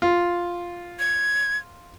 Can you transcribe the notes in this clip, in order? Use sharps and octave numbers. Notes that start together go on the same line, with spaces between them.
F4
G#6